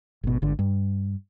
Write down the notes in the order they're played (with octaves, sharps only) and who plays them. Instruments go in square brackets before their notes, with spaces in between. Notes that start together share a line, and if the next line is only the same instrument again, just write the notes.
[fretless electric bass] G#1 B2
G#1 D3
G2